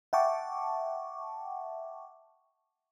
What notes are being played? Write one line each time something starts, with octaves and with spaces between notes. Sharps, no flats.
E5 F#5 G5 A5 C#6 D6